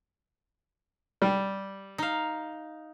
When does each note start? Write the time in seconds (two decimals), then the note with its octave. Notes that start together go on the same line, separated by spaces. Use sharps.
1.22 G3
1.98 D#4 F5